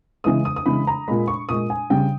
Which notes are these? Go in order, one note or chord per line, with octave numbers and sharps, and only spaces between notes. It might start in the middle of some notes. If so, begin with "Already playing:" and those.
C#3 E3 G#3 D#6
D#6
D#6
C#3 E3 G#3 B5
A#5
A#2 G#3 B5
C#6
A#2 G#3 D#6
G#5
C#3 G3 G5